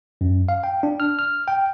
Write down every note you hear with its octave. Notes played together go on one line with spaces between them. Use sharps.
F#2
F5
G5
D4
F6
F6
G5